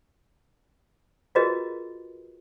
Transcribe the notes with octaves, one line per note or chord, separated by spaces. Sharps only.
F4 F#4 G#4 A#4 B4 D#5